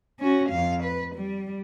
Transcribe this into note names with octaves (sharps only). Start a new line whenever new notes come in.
C#4 F#4
F2 F5
B4
G3